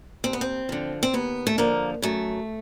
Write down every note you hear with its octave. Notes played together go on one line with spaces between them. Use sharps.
D#2 C4
B3
C4
D3 F3
C4
D#2 B3
A3
D3 F3 A#3
F#2 A3